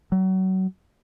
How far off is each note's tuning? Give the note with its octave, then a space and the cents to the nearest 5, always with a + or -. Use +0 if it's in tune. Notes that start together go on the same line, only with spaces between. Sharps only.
F#3 +30